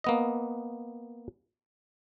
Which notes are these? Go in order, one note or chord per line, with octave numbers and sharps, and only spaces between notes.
A#3 B3 D#5